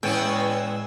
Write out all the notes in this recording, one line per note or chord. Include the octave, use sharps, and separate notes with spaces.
E2 A2 G#3 B3 C#4 G5 G#5 E6